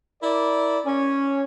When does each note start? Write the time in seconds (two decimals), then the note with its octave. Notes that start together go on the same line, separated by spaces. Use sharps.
0.23 E4 A#4 D5
0.86 C#4